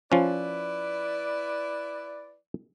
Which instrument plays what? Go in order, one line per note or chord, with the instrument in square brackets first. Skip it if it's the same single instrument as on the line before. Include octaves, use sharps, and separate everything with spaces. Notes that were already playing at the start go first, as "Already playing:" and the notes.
[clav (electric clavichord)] F3 C#4 [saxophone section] E4 B4 D5